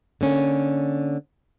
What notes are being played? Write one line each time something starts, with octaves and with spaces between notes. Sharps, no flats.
D3 A#3 C#4